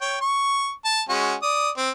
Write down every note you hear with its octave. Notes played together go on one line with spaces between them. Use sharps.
C#5 G5
C#6
A5
G#3 C#4 F#4
D5 D#6
C4